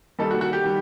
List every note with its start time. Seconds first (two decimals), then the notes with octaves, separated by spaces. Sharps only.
0.19 D#3 G3 A#3 D#4 A4
0.31 F#4
0.41 F#4
0.53 G4
0.64 D#3 G3